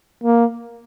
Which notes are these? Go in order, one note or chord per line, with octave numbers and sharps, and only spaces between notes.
A#3